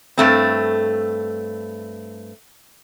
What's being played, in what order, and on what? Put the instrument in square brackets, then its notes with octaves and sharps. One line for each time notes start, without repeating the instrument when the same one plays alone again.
[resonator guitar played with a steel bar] G2 A3 C4